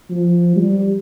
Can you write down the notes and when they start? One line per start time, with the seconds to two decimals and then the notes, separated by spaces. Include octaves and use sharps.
0.10 F3
0.56 G3